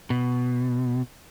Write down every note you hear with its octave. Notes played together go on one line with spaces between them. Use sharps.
B2